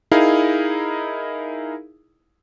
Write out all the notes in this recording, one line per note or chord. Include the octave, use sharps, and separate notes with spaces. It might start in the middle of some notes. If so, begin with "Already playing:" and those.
D#4 E4 G#4 A#4 F5